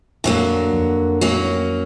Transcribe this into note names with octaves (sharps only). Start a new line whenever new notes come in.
F2 D3 F#3 A#3
F2
F#3 A#3 C#4